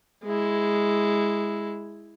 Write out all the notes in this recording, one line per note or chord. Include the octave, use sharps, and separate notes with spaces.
G#3 E4